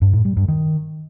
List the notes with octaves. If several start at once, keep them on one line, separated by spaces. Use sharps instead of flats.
G2
A2
G3
G2
D#3